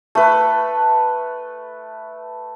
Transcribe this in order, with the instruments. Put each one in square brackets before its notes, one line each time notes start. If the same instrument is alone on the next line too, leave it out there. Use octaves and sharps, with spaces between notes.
[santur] A3 B4